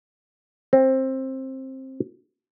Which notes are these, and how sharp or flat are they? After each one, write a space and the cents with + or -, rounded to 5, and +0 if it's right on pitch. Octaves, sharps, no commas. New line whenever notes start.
C4 +15